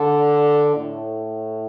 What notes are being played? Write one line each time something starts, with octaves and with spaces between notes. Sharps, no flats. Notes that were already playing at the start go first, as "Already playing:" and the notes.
Already playing: D3
A2